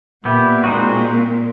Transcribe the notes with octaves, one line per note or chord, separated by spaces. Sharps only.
A#2 B3 E4 G4
G#3 C4 D#4 F#4